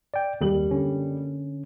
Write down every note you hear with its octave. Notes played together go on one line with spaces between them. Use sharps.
D5 G5
F#1 D#2 G3 F#7
D3 C#4